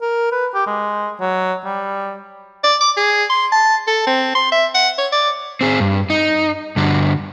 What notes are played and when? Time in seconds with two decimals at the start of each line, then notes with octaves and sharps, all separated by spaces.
0.01 A#4
0.31 B4
0.54 G4
0.66 G#3
1.20 F#3
1.65 G3
2.64 D5
2.81 D6
2.97 G#4
3.29 C6
3.52 A5
3.87 A4
4.07 C4
4.35 C6
4.52 E5
4.74 F#5
4.98 C#5
5.12 D5
5.61 C4 G#4
5.80 G2
6.10 D#4
6.76 G2 D3 F#4